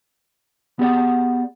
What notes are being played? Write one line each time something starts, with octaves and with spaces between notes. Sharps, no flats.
B3 G4 G#4 D5 F#5